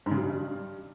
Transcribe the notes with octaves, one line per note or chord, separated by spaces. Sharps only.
G#2
C#3
F#3
G2